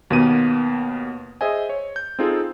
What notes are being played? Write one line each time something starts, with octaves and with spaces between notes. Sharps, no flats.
D#2 B2 A#3 B3 D#7
G#4 C5 D#5 E5 G#5
C#5
G6
C4 D#4 F4 G#4 A4